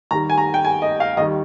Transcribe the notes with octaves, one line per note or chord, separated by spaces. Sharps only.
D#2 D#3 G3 A#5
G#5
A#5
G5
G#5
D#5
F5
D#2 D#3 G3 D#5